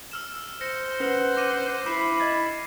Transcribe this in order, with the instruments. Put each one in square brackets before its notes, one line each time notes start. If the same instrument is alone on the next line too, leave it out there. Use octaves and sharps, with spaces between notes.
[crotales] E6 F6 E7
[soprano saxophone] C5 [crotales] A#6 C#7
[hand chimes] C#4 B4 [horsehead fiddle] F#5
[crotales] D6 A#6 D#7
[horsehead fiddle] E4 [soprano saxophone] B5 [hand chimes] D6 [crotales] C7 E7
[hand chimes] D#5 G#6 A6